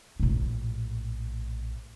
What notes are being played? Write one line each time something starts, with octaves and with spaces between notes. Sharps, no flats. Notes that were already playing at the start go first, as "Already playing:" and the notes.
A#1 A2